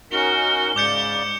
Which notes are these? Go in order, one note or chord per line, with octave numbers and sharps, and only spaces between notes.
C#4 D#4 F#4 A#4 G7
G#2 C#3 D5 D6 G6 C#7